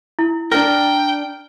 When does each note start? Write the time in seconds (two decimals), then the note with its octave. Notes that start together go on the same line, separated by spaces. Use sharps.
0.19 E4
0.52 D4 A#4 G5 F6